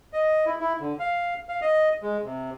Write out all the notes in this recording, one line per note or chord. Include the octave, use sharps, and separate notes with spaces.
D#5
E4
E4
D3
F5
F5
D#5
G#3
C3